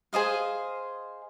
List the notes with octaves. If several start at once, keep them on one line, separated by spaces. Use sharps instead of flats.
G#4 C5 D#5 F5